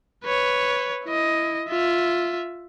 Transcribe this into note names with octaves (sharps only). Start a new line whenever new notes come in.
B4 C#5
E4 D#5
F4 E5